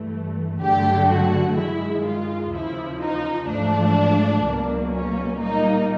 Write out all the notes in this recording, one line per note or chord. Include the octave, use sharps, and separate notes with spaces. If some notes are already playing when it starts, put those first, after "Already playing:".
Already playing: G2 E3 A3
G2 D3 F#3 A3 G4
F#4
G2 D#3 G#3 E4
F4
D#2 C#3 F3 E4
D#4
G#2 F3 A3 D4
C#2 B2 F#3 A#3
C#4
A#2 G3 A#3 D#4